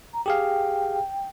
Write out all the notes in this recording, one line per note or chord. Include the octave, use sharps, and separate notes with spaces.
A#5
G4 G#4 F5 G5